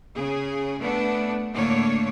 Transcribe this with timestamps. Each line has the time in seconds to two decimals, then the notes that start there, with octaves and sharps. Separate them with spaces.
0.14 C#3 G#4
0.80 A3 B3 D4
1.53 A2 D3 A3 A#3 D4 C#5